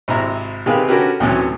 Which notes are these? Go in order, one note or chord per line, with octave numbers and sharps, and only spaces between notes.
G#1 C3 E4 A#5
C3 D#3 G4 G#4 B4 F5
D3 C#4 F#4 G4 A#4 B4
D2 A2 C3 E3 F#3 C#4